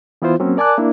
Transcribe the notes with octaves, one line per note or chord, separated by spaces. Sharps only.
E3 B3 E4 F4 C5
F#3 A#3 C4 C#4
A#4 D5 G#5 A5 D6 F#6
A#3 D4 E4